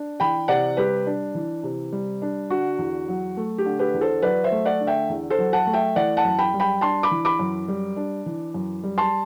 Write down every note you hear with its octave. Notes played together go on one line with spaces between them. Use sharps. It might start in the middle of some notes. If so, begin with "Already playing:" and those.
Already playing: D4
E3 G5 B5
C3 D5 F#5
G3 G4 B4
D4
E3
C3
G3
D4
D3 F#4
E2
F#3
A3
G4
D3
G4 B4
E2
A4 C5
F#3 B4 D5
C5 E5
A3
D5 F#5
D3
E5 G5
E2
A4 C5
F#3
F#5 A5
A3
E5 G5
E3 D5 F#5
F#5 A5
F#2
G5 B5
G3
G5 B5
D4 A5 C6
B5 D6
E3
B5 D6
F#2
G3
D4
E3
F#2
G3
A5 C6